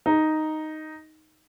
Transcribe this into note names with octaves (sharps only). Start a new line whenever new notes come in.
D#4